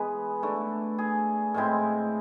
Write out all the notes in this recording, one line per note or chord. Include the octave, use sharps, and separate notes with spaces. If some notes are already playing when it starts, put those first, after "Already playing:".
Already playing: E3 G#3 B3 G#4 B4
D3 A3 E4
G#4
A2 G#3 C4 E4